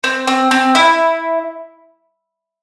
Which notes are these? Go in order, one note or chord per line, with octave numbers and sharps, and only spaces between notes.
C4
C4
C4
E4